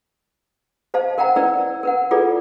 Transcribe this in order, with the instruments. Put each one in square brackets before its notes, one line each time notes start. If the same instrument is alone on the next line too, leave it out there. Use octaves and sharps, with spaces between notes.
[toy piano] C5 D#5 F5 A5
A#4 D#5 F#5 G5 A#5
E4 A#4 B4 D5 E6
A#4 B4 F#5
E4 F4 G#4 A4 B4 D5